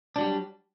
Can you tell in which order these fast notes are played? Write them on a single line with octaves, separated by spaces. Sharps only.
D4 F#3 G3